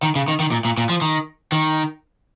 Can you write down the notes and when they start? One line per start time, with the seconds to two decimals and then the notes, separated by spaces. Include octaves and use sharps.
0.03 D#3
0.15 C#3
0.28 D#3
0.40 D#3
0.52 A#2
0.65 A#2
0.78 A#2
0.89 F3
1.02 D#3
1.52 D#3